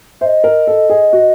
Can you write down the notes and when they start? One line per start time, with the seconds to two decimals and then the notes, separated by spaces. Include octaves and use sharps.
0.21 C5 D#5 E5
0.44 A#4
0.67 A4
0.90 G#4
1.13 F#4